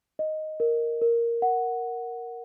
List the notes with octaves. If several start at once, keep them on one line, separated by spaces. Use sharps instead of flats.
D#5
A#4
A#4
F#5